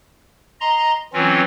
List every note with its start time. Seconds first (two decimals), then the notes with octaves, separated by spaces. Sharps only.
0.61 D#5 A#5 C6
1.13 E3 F#3 C4 C#4 F4